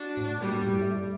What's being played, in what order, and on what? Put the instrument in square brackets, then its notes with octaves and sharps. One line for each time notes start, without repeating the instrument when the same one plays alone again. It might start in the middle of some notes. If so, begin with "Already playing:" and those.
Already playing: [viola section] D4 F#4
[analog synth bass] A2
[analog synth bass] A#2 [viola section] G3
[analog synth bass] A2
G2
A2
A3
G3